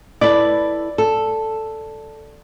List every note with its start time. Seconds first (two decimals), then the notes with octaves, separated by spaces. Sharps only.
0.21 E4 A4 B4 D5
0.98 A4